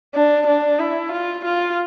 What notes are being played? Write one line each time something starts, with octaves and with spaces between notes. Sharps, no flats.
D4
D4
E4
F4
F4